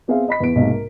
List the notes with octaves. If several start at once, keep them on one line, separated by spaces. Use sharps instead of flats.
B3 C4 G#4 C5 E5 F5
D#5 B5 B6
E2 B3 D7
B1 G#2 C3 A#3
A#4